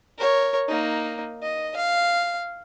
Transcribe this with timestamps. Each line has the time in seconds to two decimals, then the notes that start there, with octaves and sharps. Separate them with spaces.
0.18 A#4 C#5
0.68 A#3 D#4
1.42 D#5
1.76 F5